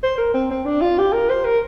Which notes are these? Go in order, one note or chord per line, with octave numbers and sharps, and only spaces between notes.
C5
A#4
C4
C4
D4
F4
G4
A#4
C5
A#4